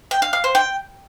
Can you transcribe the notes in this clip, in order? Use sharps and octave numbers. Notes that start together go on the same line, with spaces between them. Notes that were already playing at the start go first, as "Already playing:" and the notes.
G5
F5
F5
C5
G5